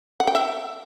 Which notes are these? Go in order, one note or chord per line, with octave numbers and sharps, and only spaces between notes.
F#5
G5
E5